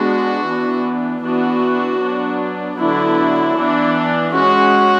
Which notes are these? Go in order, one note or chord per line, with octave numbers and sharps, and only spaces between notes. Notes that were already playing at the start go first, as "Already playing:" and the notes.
Already playing: G#3 B3 D4 F#4
E3 B3 D4
E3 B3 D4 F#4
F#3 B3 D4
D3 F#3 B3 D4 E4
E3 B3 D4
G#3 C#4 F#4